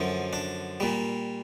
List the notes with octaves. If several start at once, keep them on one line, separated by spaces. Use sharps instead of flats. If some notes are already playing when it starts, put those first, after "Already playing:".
Already playing: F#2 D3 F3
D4
A#2 G3